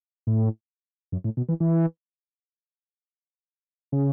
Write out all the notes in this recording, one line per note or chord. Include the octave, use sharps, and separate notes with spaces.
A2
F#2
A2
B2
E3
E3
C#3